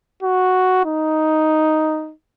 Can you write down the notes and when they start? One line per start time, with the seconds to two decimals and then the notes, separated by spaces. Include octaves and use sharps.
0.23 F#4
0.85 D#4